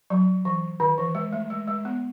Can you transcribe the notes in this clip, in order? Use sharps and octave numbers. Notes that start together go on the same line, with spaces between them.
F#3
E3
D#3
E3
G#3
A3
G#3
G#3
B3